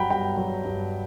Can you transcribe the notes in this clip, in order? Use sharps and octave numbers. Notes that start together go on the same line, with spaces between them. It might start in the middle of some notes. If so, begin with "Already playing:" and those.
Already playing: G2 F#3 F#5 G5 A#5 B5
G2 G5 B5
F#3
G2